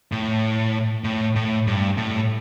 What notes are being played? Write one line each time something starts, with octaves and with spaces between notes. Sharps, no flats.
A2
A2
A2
G2
A2